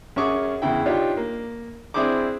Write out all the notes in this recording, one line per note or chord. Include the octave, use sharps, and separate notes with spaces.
F#2 C#4 G#4 C#6 D6
E2 C#3 E4 G5
D4 D#4 F4 G4 C#5
A#3
C4 D4 E4 G#4 C5 D6